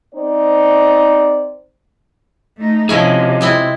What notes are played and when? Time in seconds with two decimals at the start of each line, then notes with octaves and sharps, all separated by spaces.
0.13 C4 D#4 C5 D5
2.58 A3 D#4
2.89 C3 F3 C#4 E4 G#4 D#5
3.41 G#3 C4 E4